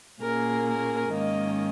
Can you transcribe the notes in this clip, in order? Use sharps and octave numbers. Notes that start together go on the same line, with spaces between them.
A#2 A#3 C#4 G#4 A#4
A#4
G#2 D#3 A#3 C#4 D#5